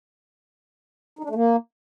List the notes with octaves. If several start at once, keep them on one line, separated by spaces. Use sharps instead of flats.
D#4
D4
A3
A#3